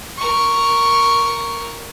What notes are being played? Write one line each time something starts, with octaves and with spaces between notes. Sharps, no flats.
A#4 C#6